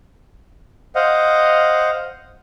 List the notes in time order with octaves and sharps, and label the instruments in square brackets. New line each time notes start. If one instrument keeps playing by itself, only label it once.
[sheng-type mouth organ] C5 D#5 F5 F#5